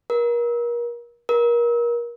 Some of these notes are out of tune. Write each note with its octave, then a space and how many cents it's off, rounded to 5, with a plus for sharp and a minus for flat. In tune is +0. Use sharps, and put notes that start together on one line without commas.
A#4 +35
A#4 +30